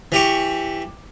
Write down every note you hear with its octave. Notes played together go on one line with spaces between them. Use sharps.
E3 G4 C#6